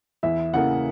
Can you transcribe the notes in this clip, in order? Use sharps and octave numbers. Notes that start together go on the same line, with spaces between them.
E2 E5
C#3 E3 A#3 F#5